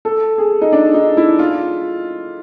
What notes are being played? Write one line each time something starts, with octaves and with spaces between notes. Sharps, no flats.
A4
G#4
D#4
D4
D#4
E4
F4